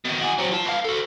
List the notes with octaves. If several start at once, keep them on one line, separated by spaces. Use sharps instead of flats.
B2 D#3
F#4 G#4
F#3 C4
F4 A5
B3 F5
F#4 A4